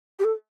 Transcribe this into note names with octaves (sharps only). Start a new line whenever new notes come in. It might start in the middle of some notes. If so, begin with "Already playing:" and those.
G4
A4